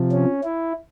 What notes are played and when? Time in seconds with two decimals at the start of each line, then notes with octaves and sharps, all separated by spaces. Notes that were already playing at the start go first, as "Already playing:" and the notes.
Already playing: C3 F3
0.12 C#4
0.44 E4